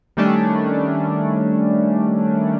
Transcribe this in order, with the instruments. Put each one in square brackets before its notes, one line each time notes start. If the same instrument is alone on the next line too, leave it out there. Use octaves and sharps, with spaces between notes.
[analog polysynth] D#3 G3 A3 C#4 D4